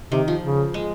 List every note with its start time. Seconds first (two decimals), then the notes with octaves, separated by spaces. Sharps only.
0.12 C3 D#3
0.28 F3
0.43 C#3
0.74 G#3